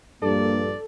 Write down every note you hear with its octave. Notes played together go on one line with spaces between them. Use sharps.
A#1 G2 A#3 A4 D5